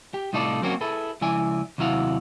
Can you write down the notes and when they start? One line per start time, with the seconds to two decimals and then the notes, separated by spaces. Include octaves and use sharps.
0.14 G4
0.33 C2 A2 D#4 F4 A4 D5
0.63 F#3 A#3 C4 C#4 F#4
0.81 E4 G#4 A4 B4
1.21 C#2 F3 E4 D5 G#5
1.78 D#2 C3 F#3 E4 F5 F#5